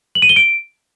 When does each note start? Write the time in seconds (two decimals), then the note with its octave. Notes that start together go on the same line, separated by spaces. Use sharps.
0.15 F#7
0.22 D#7
0.29 G7
0.36 D7